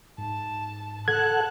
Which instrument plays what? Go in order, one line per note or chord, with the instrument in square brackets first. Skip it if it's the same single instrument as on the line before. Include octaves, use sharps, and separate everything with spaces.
[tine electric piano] G#2 [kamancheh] A5
[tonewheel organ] A4 F#5 [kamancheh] A5 F#6 [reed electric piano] G#6